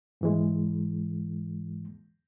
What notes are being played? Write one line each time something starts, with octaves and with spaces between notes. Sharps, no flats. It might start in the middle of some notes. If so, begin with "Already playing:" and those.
G#2 E3 G#3